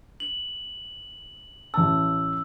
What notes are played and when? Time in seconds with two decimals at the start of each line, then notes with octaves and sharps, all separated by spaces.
0.20 F#7
1.74 A1 A5 E6